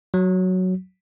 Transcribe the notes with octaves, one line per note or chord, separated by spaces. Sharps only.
F#3